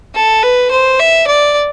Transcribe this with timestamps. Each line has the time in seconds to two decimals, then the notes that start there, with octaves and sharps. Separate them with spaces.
0.15 A4
0.43 B4
0.71 C5
1.00 E5
1.27 D5